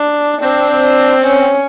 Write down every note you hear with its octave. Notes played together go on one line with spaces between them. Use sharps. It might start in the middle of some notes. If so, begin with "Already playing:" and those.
Already playing: D4
C4 D4
C#4